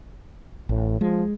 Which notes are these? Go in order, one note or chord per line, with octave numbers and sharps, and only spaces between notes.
A1 A2
F3 G#3